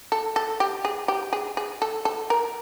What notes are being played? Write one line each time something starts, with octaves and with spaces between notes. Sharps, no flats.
A4
A4
G4
G#4
G4
G#4
G#4
A4
A4
A#4